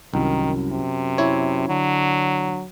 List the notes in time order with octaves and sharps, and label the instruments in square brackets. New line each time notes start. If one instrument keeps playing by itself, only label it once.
[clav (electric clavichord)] C2 [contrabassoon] F#2 [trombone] D#3
[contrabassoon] F#2 [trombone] C3
[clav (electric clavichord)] E4 C#5
[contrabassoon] D3 [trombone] F#3